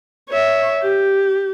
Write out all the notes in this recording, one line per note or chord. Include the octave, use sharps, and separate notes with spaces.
C#5 E5
G4